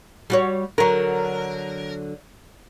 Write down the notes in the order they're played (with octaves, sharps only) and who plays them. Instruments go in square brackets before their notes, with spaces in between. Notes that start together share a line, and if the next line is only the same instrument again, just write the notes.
[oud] G3 F#4 C#5
[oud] D3 F#3 [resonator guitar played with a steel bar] A#4